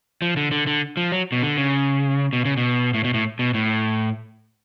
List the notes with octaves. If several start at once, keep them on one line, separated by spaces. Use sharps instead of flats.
F3
D3
D3
D3
F3
F#3
B2
D3
C#3
B2
C#3
B2
A2
B2
A2
B2
A2